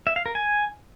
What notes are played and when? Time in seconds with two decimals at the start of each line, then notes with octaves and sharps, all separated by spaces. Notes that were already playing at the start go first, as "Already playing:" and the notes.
0.07 E5
0.16 F5
0.26 A#4
0.35 G#5